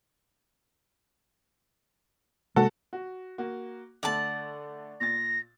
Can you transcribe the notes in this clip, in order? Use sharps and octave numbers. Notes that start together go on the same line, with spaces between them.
C3 G#3 A#3 F#4 A4
F#4
A#3 F#4
D3 A3 D5 F#5 A5
A#2 A6 A#6